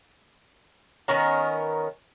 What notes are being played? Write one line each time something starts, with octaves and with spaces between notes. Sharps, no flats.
D#3 B3 C#4 A#4